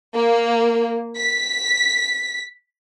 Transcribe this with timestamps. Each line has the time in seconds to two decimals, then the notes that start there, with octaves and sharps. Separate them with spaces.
0.14 A#3
1.17 B6